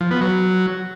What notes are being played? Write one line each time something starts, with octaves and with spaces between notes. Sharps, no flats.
F3
B3
F#3